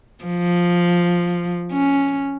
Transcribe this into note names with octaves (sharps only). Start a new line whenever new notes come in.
F3
C#4